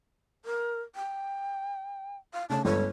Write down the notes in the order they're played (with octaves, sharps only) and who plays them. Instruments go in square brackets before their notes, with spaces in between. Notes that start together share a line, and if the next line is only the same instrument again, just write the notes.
[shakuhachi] A#4
G5
F5
[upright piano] C#3 A3 C#4 [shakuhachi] A5
[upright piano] G1 C#2 A4 [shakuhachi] C#5